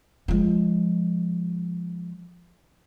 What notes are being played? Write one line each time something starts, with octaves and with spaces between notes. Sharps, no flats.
F3 G#3